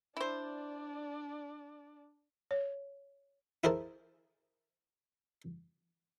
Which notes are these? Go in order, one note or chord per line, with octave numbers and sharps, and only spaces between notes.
D4 E4 C5 D5
C#5
E4 G#4 A#4 C5 A5